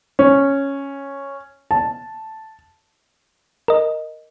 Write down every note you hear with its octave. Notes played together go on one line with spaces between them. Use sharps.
C#4
A5
A#4 D#5